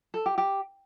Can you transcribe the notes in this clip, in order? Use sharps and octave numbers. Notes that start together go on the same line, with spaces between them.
A4
G4
G4